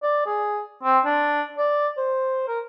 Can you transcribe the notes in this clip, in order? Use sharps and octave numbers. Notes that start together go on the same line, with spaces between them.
D5
G#4
C4
D4
D5
C5
A#4